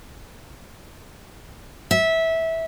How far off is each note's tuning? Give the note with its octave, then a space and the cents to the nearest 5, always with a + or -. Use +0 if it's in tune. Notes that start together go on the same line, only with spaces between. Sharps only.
E5 -15